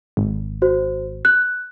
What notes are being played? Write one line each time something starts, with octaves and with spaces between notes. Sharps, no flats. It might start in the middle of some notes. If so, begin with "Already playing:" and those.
G#1
F#4 C5
F#6